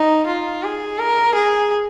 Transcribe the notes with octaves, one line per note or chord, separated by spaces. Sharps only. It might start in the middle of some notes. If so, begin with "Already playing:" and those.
Already playing: D#4
F4
G#4
A#4
G#4